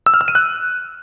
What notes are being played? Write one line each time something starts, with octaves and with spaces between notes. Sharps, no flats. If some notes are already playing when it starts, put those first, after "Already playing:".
E6
F6
E6
D#7
F#6